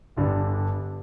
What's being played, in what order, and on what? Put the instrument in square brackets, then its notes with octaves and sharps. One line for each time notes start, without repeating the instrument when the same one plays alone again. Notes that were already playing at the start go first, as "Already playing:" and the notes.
[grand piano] G1 G2 D3 G3 D4